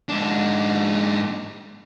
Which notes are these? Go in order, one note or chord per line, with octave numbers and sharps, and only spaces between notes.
G#2 D4